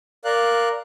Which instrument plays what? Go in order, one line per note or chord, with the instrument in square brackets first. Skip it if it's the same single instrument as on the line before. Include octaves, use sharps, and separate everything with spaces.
[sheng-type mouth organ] A#4 D5 F5 F#6